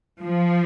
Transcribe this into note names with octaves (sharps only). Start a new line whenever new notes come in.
F3